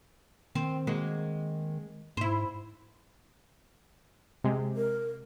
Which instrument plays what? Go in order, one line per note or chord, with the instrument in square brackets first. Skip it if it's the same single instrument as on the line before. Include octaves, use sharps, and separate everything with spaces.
[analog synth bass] D#3 [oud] C4
[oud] G#3 A#3 F#4
[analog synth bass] G#2 [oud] E4 C5
[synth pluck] C3 G#3
[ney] A#4